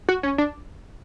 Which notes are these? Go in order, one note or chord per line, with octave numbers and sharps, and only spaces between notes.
F#4
C#4
D4